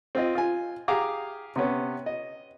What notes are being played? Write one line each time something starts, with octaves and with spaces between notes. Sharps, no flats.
C4 F4 D#5
F4 G#5
G4 G#4 F5 G#5 A#5 D6
C3 B3 C#4
D#5